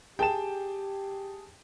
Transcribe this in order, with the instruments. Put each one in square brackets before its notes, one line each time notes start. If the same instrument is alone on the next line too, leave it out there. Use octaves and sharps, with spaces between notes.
[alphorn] G4 [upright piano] G#4 A5 E7 [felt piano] G5